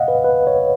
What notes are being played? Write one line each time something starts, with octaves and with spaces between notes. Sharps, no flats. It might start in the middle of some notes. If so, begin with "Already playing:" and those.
Already playing: D#5 F5 F#5
B4
B4
C#5